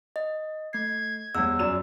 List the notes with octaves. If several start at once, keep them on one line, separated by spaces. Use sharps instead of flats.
D#5
A3 G#6 C7
G1 E2 E6
F#2 D5 E7